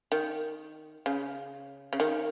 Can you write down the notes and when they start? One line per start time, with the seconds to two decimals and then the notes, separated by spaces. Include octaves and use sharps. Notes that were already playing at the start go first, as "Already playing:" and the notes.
0.12 D#3
1.06 C#3
1.93 C#3
2.00 D#3